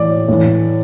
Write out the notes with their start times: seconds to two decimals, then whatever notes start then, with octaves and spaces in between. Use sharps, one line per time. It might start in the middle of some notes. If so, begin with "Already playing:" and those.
Already playing: A2 E3 D5
0.28 A2 E3